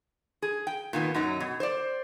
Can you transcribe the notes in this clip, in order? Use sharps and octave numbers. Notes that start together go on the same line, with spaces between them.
G#4
G5
A#2 D#3 B3
F#2 F#3 D#4
B2
C5 D5